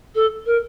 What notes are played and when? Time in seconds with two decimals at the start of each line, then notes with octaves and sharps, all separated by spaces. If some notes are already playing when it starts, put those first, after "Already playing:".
0.15 A4
0.46 A#4